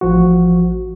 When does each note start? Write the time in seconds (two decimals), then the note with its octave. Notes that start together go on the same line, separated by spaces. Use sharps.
0.01 A1 F3 F#4